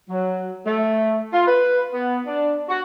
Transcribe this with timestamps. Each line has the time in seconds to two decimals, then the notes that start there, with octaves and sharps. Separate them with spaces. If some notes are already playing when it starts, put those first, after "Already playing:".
0.10 F#3
0.66 A3
1.33 F4
1.47 B4
1.92 B3
2.26 D4
2.69 F#4